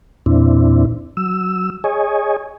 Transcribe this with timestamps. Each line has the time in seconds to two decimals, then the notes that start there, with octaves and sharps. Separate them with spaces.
0.26 E2 A#2 C4 D4 E4
1.17 F#3 E6
1.84 G#4 C#5 D#5 G#5